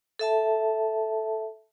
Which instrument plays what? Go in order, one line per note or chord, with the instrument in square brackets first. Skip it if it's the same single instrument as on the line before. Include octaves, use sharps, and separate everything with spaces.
[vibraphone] A4 E5 A5